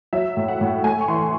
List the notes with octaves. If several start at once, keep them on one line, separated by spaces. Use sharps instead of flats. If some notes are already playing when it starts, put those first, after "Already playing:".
F#3 E5
A2
F#5
A2
A3 G#5
C#6
E3 C6